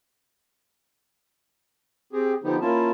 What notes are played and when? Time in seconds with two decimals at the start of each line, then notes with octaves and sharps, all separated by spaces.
2.13 C4 G4 G#4
2.44 D3 F3 B3 D#4 G4
2.61 A#3 C#4 E4 F4 A5